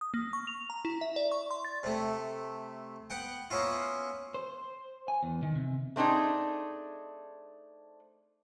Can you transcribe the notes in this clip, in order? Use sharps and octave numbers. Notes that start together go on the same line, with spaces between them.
D#6
A#3
C#6
F7
A#5
E4
E5
D5
C#6
C6
A6
C3 A3
B3 F#5 G5
A#3 B3 C#4 E4 F4
C5
G#5
E2
D#3
C3
A3 C4 D4 D#4 G#4